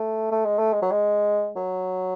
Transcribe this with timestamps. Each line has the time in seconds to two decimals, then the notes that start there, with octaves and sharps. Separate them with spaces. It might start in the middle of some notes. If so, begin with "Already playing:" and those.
Already playing: A3
0.31 A3
0.46 G#3
0.59 A3
0.73 G#3
0.82 F#3
0.91 G#3
1.56 F#3